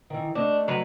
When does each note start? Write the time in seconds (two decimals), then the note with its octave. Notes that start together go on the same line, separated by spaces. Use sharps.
0.10 D#3 E3
0.35 A3 D4 D#5
0.68 F#3 B4